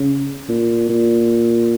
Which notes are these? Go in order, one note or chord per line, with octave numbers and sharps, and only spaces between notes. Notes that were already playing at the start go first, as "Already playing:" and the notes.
Already playing: C#3
A#2
A#2